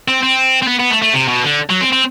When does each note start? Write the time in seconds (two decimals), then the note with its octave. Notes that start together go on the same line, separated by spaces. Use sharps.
0.08 C4
0.23 C4
0.63 C4
0.68 B3
0.80 B3
0.91 A3
1.02 A3
1.13 C3
1.28 B2
1.43 D3
1.70 F#3
1.81 C4
1.92 C4